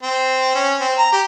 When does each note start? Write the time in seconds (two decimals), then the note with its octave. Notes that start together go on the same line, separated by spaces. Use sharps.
0.03 C4
0.55 C#4
0.80 C4
0.98 A#5
1.13 G4